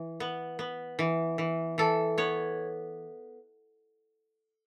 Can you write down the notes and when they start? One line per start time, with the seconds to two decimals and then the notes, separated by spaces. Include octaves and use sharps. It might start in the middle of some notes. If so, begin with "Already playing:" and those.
Already playing: E3
0.20 B3
0.59 B3
0.99 E3
1.38 E3
1.78 E3 A4
2.18 B3 C#5